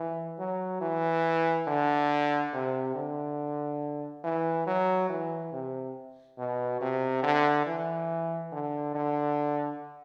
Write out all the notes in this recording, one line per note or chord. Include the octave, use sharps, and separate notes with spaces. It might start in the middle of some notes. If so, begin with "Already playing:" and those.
Already playing: E3
F#3
E3
D3
C3
D3
E3
F#3
E3
C3
B2
C3
D3
E3
D3
D3